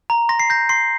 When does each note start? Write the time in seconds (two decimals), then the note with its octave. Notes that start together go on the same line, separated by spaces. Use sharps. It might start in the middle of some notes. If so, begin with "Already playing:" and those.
0.10 A#5
0.29 C6 A#6
0.40 C7
0.50 G6 A#6
0.69 C6 C7